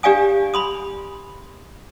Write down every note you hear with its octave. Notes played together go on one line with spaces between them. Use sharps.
D4 G4 D5 F5 G#5 D#6
B5 C6 D#6